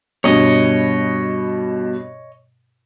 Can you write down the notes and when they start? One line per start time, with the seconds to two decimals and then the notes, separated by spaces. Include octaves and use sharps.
0.24 G2 B2 C#5 D#5